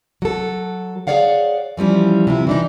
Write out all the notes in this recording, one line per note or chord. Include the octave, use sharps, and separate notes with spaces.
F#3 A4
G#4 A4 C#5 D5 F5 F#5
E3 F3 G3 C#4
C3 F3 E4
E3 D4 D#4